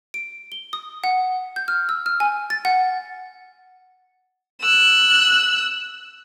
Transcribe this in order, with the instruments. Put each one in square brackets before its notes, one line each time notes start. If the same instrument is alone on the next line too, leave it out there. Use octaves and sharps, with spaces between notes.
[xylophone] D7
G7
D#6
F#5
G6
F6
E6
F6
G#5
A6
F#5
[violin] E6 F#6